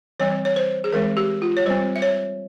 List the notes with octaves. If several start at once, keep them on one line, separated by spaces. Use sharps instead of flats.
E3 G3 C4 C#5
C#5
C5
G#4
E3 G#3 C4 A#4
G4
F4
C#5
G3 C4 C5
E5
C#5